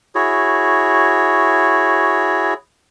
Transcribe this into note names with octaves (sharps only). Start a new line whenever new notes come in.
E4 F#4 G#4 C#5